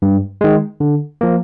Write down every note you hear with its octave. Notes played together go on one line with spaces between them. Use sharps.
G2
D#3 G#3
D3
F3 A#3